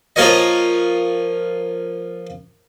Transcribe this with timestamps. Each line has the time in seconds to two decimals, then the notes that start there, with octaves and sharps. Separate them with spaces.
0.16 F3 A#3 F4 A#4 C#5 D#5